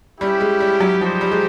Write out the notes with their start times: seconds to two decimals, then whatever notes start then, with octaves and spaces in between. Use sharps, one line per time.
0.20 G3 C#4 E4 G4
0.40 G#3
0.60 G3
0.80 F#3
1.00 F3 D#4 G4 C5
1.21 G3
1.32 G#3